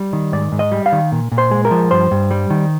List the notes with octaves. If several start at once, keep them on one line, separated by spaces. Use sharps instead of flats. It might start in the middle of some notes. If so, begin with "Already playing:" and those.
Already playing: G3
D#3
G#2 D5
G#2
D#5
G3
F5
D#3
A#2
A#2
C5
G#3
A#4
F3
G2 C5
G2
G3
D#3